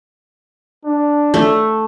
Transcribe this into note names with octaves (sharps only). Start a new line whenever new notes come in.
D4
A3